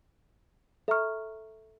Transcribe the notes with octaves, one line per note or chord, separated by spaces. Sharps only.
A4 E5 A#5 C#6 F6